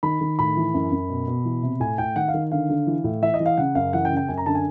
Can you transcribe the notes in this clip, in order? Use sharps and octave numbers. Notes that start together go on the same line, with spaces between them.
D#3 B5
D#3
A2 B5
E3
F#2
F#2
B2
B2
E3
C3
A2 G#5
A2 G5
D#3 F#5
F5
D#3
D3 F5
D3
E3
A2
E3 E5
D#5
E3
F5
C#3 F#5
F#2 F5
E3 F#5
G5
C#3
G5
F#2 G#5
A#5
D3 A5
G#5